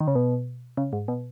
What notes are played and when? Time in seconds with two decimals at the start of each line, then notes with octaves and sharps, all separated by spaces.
0.01 D#3
0.08 C#3
0.15 B2
0.77 C#3
0.93 G#2
1.08 B2